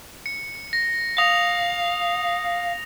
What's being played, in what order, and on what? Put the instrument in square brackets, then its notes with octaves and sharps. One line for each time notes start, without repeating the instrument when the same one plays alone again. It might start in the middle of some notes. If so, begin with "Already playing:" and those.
[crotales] C#7
A#6
[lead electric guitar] F5 [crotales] D#6 A#6 F7